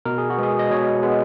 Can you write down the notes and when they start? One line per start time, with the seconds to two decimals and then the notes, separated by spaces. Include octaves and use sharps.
0.05 B2 A#4
0.18 G#4
0.30 F#4
0.38 G#3 B3 G#4
0.59 D#5
0.71 B2 C#5
1.03 G#3 B3